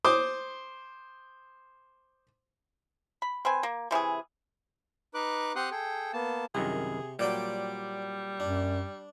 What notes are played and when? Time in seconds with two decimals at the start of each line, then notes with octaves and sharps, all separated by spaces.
0.05 C5 C6 D6 D#6
3.22 B5
3.45 C4 B4 G#5
3.63 A#3
3.91 C3 E3 D4 G#4
5.14 D#4 B4 D6 F#6
5.56 C4 G4 F#5 C6 D#6 F#6
5.71 G#4 A4 G5
6.13 A#3 B3 A5
6.55 C2 F#2 C3 D#3 G#4
7.19 A#2 F#3 G3 C5 D5 G5
8.40 F#2 D4